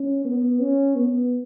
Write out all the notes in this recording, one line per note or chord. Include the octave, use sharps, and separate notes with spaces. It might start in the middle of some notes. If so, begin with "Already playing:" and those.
Already playing: C#4
B3
C#4
B3